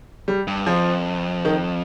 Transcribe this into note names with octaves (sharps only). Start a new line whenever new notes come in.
G3
G2
F2 F3
D#3